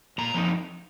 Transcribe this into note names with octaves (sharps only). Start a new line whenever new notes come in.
A#2 A#5
F3 C4 D#4